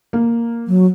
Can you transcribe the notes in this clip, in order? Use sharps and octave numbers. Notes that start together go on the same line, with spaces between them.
A#3
F#3